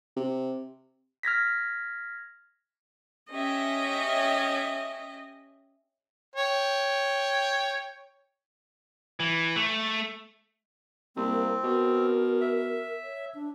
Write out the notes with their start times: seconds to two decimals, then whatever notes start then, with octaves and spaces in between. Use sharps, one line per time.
0.17 C3
1.23 F6 G#6 A#6 B6
3.31 C#4 G4 D#5 E5
6.36 C#5 G5
9.20 E3
9.56 A3
11.16 C2 A#3 C4
11.64 B2 A#4
12.41 E5
13.03 C#5
13.34 D4